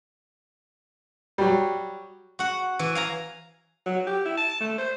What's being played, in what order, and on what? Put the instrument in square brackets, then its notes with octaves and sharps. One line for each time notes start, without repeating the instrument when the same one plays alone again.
[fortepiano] F#3 G3
[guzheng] F#4 F#5
E3
F5 G#5 A#5
[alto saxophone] F#3
G4
E4
A5
A3
C5